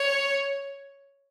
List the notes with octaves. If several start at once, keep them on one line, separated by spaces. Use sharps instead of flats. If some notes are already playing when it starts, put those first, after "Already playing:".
Already playing: C#5